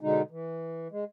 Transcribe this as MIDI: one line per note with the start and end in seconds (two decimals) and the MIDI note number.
0.01 0.22 47
0.01 0.22 50
0.01 0.22 56
0.01 0.22 63
0.31 0.88 52
0.91 1.04 56